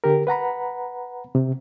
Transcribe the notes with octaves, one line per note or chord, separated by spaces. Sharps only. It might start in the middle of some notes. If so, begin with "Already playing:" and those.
D3 G4 A#4
B4 F#5 A#5 B5
C3